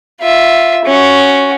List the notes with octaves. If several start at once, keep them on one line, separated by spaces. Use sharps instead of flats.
F4 E5
C#4 F#4